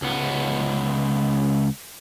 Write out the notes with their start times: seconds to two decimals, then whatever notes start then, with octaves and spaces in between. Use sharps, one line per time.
0.02 C#2 B3